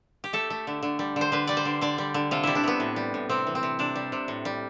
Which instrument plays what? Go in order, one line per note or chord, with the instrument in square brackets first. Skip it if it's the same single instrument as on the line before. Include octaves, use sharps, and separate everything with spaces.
[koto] G4
A3 A4
A3
D3
D3
G3
D3 C5
D3 B4
G3 D5
C5
D3
D3 D5
G3
D3
C3 F4
G3 E4
D4
C3 B3
A2
G3
A2
C3 C4
E3
C4
C3
C3 D4
G3
C3
A2
G3